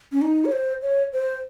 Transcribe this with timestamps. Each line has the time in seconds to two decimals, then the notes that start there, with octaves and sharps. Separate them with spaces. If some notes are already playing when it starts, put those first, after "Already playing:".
0.12 C#4
0.22 D#4
0.45 C#5
0.52 C5
0.82 C#5
1.13 C5